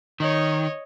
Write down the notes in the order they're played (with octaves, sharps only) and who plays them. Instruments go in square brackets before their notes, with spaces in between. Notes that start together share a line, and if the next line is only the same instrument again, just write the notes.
[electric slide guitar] D#3 [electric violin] C#5 D#5